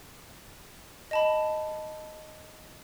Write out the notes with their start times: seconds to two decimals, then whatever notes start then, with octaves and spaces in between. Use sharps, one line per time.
1.11 D#5 A5 B5